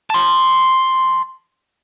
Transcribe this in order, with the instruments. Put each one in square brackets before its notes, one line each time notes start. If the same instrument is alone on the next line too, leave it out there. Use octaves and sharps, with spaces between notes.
[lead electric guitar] A5 C6